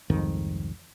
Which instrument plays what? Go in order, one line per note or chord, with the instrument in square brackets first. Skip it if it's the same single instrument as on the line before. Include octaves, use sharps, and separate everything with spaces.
[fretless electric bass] C2 F2 G#2 D#3